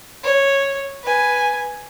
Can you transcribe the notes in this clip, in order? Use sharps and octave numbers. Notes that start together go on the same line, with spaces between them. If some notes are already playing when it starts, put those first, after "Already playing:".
C#5
B4 G#5